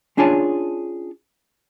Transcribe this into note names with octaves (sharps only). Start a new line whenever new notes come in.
C#4 D4 F4 G#4 C#5 A5